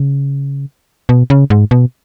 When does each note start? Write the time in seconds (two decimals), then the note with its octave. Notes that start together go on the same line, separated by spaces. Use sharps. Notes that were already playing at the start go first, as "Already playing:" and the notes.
Already playing: C#3
1.09 B2
1.30 C#3
1.50 G#2
1.71 B2